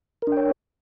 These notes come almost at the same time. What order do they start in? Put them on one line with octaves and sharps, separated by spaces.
A#4 D4 G5 C#5